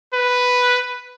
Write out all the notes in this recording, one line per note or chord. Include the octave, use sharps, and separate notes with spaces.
B4